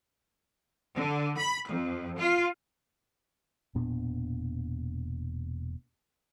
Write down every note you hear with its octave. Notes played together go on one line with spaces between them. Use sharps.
D3
B5
F2
F4
E1 A#2 B3 D4